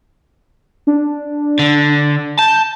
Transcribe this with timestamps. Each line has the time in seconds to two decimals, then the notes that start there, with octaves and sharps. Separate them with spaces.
0.87 D4
1.59 D3
2.39 A5 G6